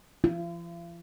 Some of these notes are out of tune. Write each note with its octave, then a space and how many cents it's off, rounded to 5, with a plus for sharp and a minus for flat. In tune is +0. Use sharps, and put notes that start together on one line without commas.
F4 -45